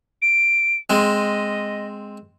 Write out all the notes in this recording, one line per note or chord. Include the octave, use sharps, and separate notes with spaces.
D7
G#3 C4 D#5